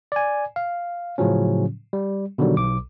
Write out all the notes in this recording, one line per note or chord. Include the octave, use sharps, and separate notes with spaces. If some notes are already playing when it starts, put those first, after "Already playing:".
D5 G#5
F5
A2 C#3 F3 F#3 C#4
G3
B2 D3 D#3 F#3 G3
B1 D6